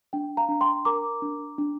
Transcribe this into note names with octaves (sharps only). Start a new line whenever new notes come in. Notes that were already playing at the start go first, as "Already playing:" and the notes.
D4 G5
F5 A#5
D4
G5 C6
A#4 A#5 D6
D4
D4